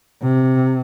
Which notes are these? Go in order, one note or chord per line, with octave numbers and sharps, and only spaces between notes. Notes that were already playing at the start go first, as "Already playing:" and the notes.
C3